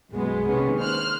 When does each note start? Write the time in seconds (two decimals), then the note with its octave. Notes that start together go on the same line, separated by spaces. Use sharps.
0.12 B1 F#2 B2 G#3 B3
0.47 C3 D#3 G#3 A#3 B3 C#4
0.79 C5 F6 F#6